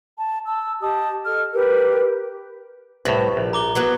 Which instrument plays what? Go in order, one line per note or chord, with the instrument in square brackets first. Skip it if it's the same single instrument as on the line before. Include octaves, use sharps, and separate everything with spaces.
[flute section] A5
A5 E6
G4 D#5 A5 D#6
A4 D#5 F6
G4 A#4 B4
[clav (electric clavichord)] C2 A2 [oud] B4
[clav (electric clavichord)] A#1
[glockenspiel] A#5 D6 G7
[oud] F#3 B3 F#4